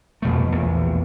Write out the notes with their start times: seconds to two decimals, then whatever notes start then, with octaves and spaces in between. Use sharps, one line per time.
0.22 F2 B2 A3
0.52 A#1 E2